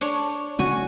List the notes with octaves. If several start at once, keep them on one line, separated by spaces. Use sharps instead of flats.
D4 C#5
C#3 G#3 C#4 F#4 G#5